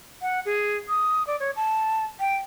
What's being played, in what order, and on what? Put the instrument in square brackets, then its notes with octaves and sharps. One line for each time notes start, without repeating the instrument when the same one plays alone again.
[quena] F#5
G#4
D#6
D5
C#5
A5
G5